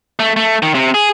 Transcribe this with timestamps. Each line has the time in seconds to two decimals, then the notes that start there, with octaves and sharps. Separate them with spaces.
0.19 A3
0.36 A3
0.62 D#3
0.75 C3
0.94 G#4